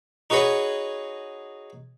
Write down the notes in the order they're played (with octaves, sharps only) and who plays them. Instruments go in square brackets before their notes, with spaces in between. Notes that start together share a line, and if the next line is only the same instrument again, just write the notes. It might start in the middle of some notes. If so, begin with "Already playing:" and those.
[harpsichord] D#4 F#4 G#4 B4 C#5